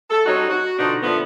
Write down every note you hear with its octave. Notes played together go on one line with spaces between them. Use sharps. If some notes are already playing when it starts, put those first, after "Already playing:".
A4
G3 C4 C#4 D#4 F#4 C#5
F#4
B2 D3 F3 B3 D4 D#4
A#2 D3 F3 A3 B3